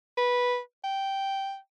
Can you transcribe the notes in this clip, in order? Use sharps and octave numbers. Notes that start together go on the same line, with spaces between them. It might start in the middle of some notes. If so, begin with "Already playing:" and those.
B4
G5